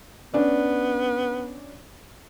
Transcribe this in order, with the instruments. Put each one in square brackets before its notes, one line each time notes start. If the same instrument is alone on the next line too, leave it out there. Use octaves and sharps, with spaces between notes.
[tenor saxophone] B3 [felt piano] C#4 D4 D5